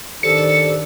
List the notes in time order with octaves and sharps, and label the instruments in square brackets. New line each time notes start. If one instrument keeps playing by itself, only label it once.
[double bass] D#3 D4 [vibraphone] G4 C5 D5 [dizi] A4 [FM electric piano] C#7